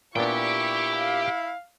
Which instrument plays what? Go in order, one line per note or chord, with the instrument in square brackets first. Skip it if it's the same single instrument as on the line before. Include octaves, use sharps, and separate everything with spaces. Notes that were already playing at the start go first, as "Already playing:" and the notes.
[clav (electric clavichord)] A#2 B3 D4 [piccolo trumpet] E4 [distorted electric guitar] G4 G5 [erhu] C#6
[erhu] F5